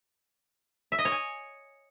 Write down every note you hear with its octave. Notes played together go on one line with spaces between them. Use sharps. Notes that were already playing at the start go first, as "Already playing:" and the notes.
E5
D#5
C#5
G#5